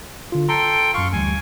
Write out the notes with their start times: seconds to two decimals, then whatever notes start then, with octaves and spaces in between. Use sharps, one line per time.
0.32 D3 F4
0.49 A4 G5 A#5 C6
0.94 F#2 F5 C6 C#6 C#7
1.13 D2 E3 G3 G#5